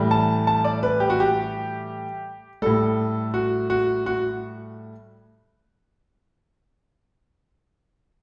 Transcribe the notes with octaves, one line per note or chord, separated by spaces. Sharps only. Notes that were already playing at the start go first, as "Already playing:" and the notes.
Already playing: A2 E3 G3
A5
A5
D5
B4
G4
F#4
G4
A2 G3 A4
F#4
F#4
F#4